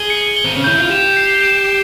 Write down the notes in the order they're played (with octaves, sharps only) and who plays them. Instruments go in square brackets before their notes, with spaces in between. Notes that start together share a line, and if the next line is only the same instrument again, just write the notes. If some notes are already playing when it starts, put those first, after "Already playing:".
Already playing: [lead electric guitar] G#4 [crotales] G7
[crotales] C#7
G7
[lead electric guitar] C4
C#4
[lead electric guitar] E4 [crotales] G6
[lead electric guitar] F4
[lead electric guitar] G4 [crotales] E7
[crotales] C7
E7